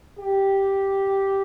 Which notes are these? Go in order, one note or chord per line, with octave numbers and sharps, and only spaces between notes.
G4